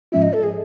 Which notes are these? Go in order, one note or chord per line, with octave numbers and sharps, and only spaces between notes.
G#2 F3 G#3 C#4 F4 E5
D#5
A4
G#4